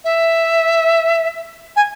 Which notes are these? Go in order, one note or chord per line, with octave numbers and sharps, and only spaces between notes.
E5
G#5